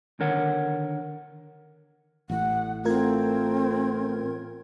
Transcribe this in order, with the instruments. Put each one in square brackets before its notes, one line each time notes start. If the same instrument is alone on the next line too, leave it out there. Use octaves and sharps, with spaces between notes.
[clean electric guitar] D3 D#3 A#4 C#5 F#5
[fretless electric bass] A1 A2 [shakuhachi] F#5
[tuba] A3 [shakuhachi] C4 [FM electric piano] F4 A#4 G#6